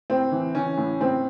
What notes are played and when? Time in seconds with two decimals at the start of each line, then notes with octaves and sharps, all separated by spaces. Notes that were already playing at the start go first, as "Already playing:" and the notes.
0.10 A2 C4
0.32 E3
0.55 E3 C#4
0.78 A2
1.01 A2 C4